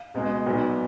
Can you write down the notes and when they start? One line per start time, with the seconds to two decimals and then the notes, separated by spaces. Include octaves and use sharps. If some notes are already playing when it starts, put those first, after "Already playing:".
Already playing: F5
0.14 C#2 B2 G#3
0.46 B1 A#2 F#3 B3